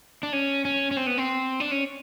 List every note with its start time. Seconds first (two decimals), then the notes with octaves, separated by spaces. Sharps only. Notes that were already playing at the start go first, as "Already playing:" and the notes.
0.23 D4
0.33 C#4
0.65 C#4
0.91 C#4
0.97 C4
1.07 B3
1.18 C4
1.60 D4
1.71 C#4